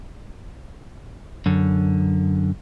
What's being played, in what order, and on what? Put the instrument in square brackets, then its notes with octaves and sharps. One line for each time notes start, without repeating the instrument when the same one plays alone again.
[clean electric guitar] F#2 D3